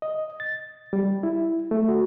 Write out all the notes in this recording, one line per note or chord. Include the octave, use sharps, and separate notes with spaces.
D#5
A6
G3
E4
A3
F#4